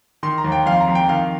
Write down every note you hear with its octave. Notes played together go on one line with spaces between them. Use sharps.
D#3 C6
A#5
D#2
G5
F2 F5
C6
A#5
F2
G5
D#3 F5